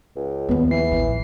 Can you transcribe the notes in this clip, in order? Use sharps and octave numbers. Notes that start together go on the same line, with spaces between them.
C#2
D#2 F3 B3
E3 C7
A1 F3